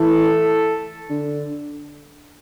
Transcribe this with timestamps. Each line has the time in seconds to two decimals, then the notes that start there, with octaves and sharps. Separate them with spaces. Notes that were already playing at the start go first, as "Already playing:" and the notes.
Already playing: E3 A3 A4
1.10 D3